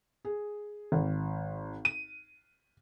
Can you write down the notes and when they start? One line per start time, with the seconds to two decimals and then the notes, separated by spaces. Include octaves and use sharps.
0.25 G#4
0.92 G#1
1.85 D#7